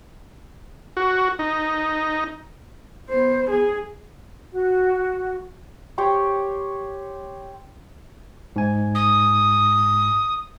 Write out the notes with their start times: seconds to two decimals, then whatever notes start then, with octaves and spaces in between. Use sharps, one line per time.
0.97 F#4
1.39 D#4
3.08 B3 C5
3.49 G#4
4.52 F#4
5.98 G4 C5 C#5 G5
8.56 G#2 G#5
8.95 D#6